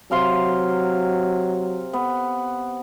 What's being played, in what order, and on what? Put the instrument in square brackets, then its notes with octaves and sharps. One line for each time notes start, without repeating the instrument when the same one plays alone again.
[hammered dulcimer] C3 F5 C6 [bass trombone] F#3
[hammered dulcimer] B3